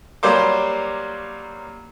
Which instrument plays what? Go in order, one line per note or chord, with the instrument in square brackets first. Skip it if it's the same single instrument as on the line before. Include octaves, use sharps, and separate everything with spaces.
[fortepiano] F#3 G3 A#3 C5 D6